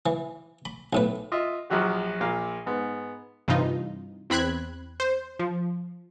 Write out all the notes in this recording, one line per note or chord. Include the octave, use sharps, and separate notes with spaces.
E3
B5
B1 A2 B4
F4 D#5 E5
A#1 F3 F#3 F#4 G4
A#1 A#2 F5
G#2 B3
G2 C3 E3 D#4 F4
E2 C4 B5 F#6 G#6
C5
F3